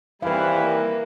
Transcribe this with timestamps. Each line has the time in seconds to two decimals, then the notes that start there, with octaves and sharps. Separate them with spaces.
0.22 D#2 E3 G3 C4 E4 B4 F5
0.61 A#3